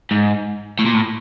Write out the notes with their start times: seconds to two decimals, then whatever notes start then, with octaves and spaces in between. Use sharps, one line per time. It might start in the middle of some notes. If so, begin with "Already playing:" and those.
0.11 G#2
0.79 A2
0.86 A#2
0.94 A2